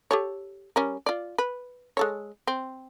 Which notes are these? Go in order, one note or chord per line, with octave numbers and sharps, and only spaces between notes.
G4 A4 C#5
G3 C#4 A#4
F4 D5
B4
G#3 A4 C#5
C4